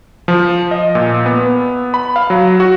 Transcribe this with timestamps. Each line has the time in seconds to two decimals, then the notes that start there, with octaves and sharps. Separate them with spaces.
0.28 F3
0.71 D#5
0.95 A#2
1.26 B3
1.94 B5
2.16 F5
2.30 F#3
2.60 F#4